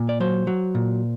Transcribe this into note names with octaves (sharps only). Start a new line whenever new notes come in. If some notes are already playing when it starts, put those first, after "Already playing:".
Already playing: A#2
D5
F#3 C5
F#3
A#2